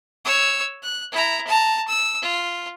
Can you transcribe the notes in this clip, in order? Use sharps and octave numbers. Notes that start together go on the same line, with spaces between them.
C#5 E6
F#6
E4 A#5
A5 A#5
E6
F4